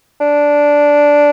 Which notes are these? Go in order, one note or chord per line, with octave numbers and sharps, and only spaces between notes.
D4